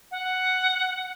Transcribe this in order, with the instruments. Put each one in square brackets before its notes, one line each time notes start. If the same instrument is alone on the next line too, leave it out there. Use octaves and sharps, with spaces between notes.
[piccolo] F#5